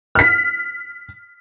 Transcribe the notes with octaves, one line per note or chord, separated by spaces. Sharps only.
F6 B6